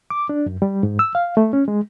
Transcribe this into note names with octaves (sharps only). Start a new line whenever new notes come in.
D6
D4
F#2
G3
G#2
E6
F5
A3
C#4
G#3